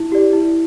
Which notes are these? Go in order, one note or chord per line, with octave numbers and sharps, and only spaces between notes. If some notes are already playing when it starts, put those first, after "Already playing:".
Already playing: E4
G4 D5
E4